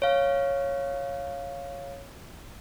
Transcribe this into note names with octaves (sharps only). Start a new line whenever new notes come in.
C#5 F5